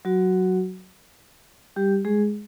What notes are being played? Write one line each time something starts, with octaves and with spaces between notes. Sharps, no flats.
F#3 F#4
G3 G4
G#3 G#4